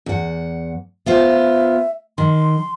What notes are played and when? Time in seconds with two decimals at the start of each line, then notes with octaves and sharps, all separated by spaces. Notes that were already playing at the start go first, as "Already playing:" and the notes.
0.06 E2 F#5
1.06 B3 F4 C5 E5
2.18 D#3 C6